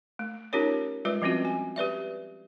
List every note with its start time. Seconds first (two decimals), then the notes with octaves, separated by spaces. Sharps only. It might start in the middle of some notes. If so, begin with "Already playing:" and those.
0.19 A3
0.53 C#4 D#4 F4 G4 A#4 C#5
1.05 G3 G#3 F4 B4 D5
1.22 F3 G3 C4 C#4 F4 F#4
1.45 G#5
1.76 G4 B4 D5 E5